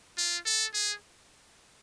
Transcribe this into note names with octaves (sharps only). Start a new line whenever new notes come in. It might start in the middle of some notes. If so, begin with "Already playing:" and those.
F4
A4
G#4